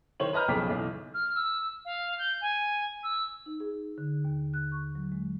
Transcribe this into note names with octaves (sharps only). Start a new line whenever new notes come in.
D#3 C5 C#5 F#7
B4 D#5 A#5 F6 G6
B1 F2 C#3 D6 B6
B1 E3
F6
E6
F5
G6
G#5
E6
D#4
G#4
D3
D#2
F#6
C#6
F#3
G#3